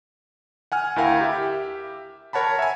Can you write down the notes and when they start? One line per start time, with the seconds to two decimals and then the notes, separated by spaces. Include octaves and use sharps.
0.72 F#5 G#5 F6
0.96 D2 E4 A#4 F5 G5
1.21 G4 E5
2.33 A#4 C#5 F#5 A5 B5
2.59 E5 G#5